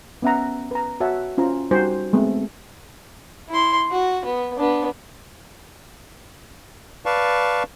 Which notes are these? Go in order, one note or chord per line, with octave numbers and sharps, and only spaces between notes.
B3 C#4 E5 F#5 A#5
B4 A#5
F#4 C#5 E5 F#5 A5
C#4 F4 C5 A#5
G3 D#4 F#4 C5 G#5
G#3 A3 B3 C4
E4 C6
F#4
B3
B3 D4
B4 D5 F5 A5 C#6